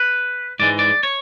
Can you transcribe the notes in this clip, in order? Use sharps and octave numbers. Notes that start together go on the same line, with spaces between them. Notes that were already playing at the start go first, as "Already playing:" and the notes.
Already playing: B4
G#2 E3 G#3 D5
D5
C#5